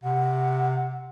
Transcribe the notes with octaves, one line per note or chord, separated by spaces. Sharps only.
C3 F#5